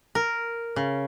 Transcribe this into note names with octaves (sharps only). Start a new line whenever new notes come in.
A#4
C#3